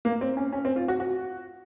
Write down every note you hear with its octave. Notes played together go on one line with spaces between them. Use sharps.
A#3
C4
C#4
C#4
C4
F4
F#4
F#4